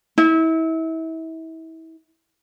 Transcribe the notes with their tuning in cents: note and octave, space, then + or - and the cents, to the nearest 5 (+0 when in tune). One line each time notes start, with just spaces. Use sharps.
E4 -30